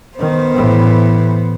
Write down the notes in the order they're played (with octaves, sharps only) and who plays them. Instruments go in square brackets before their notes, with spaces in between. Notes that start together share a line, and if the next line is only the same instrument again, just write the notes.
[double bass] D#3 [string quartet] B3 C5
[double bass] A2 E3